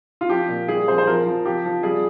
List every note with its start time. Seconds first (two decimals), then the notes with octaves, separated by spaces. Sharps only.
0.21 F4
0.29 F3 G4
0.48 A#2
0.68 G3 G#4
0.88 F2 C5
0.98 C5
1.07 F3 A#4
1.26 F3
1.45 F3 G4
1.65 F3
1.83 G3 G#4